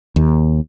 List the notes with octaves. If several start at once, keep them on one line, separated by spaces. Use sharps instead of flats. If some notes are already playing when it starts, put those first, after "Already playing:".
D#2